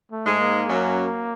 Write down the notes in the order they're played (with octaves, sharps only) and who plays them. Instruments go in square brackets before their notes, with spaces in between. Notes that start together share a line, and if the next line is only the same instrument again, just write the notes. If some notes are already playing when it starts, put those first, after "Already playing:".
[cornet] A3
[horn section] G#2 G#3
[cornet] A#3
[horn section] F#2 F#3